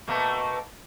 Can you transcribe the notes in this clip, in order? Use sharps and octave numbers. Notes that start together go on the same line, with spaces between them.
B2 A3 A#3